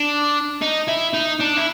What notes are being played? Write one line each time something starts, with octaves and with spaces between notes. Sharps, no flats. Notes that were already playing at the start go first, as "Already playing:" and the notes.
Already playing: D4
D#4
E4
D#4
D4
E4